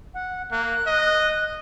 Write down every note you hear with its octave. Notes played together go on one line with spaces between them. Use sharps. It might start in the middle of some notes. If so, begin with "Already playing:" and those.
F#5
A#3 F#6
D#5